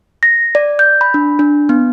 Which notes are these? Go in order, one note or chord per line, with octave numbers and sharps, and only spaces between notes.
A#6
D5
G6
B5
D4
D4
B3